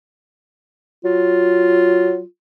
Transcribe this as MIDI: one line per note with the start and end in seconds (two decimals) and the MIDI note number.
1.05 2.19 54
1.05 2.25 65